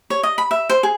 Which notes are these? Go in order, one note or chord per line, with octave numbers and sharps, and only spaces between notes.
C#5
D#5
B5
E5
C5
G#4